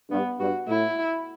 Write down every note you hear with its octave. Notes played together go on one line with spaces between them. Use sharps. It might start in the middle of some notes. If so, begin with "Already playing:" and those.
G2 B3
G2 F#4
A2 E4